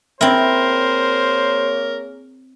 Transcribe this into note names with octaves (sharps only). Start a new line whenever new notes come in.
A#3 C4 E4 G#4 A#4 C5 C#5